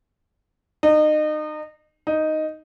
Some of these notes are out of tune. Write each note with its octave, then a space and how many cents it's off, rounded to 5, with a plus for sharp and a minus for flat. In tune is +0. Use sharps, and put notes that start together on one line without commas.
D#4 -30
D#4 +0